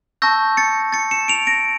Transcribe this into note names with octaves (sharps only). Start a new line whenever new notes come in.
A5 C#6 E6 G6 A#6
A6 C#7
A6 C#7
C#7 E7
D7 F7
A#6 D7